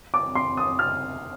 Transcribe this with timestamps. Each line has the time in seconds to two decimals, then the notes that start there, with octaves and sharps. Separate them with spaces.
0.14 D6
0.35 C6
0.57 D#6
0.79 F6